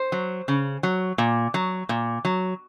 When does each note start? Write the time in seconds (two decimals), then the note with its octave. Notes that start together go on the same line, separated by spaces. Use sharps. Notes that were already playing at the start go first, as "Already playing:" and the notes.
Already playing: C5
0.12 F#3
0.48 C#3
0.83 F#3
1.18 A#2
1.54 F#3
1.89 A#2
2.25 F#3